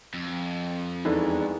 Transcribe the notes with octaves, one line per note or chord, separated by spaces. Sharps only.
F2
E2 E3 G#3 D4 D#4 A4